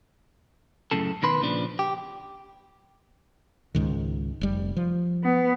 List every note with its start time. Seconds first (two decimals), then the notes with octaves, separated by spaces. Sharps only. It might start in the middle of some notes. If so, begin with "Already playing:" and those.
0.91 F#2 A2 C#3 A4
1.22 B2 D#3 B4 C6
1.41 A#2 C#3 F3 D4
1.79 G4
3.75 C#2 G#2 D#3
4.41 F1 G3
4.76 F3
5.23 B3